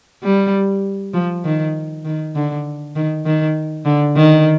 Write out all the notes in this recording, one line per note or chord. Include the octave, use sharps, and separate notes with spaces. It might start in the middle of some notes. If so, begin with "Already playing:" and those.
G3
F3
D#3
D#3
D3
D#3
D#3
D3
D#3